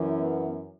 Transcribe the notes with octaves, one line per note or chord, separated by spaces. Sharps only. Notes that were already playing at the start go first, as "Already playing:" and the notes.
Already playing: F#2 E3
B3